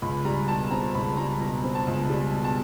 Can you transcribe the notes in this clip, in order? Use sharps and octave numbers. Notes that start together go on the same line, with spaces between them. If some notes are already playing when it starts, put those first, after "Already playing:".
C#2 B5
G3 A#5
B2 A5
C4 A#5
C#2 B5
G3 A#5
B2 A#5
C4
A5
C#2
G3
B2
A5